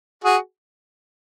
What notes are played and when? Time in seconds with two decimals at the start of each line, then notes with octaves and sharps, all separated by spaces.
0.24 F#4 G#4